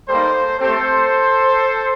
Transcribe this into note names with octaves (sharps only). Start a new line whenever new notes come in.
G3 A#3 D#4 A4 C5
A3 C4 G4 A4 C5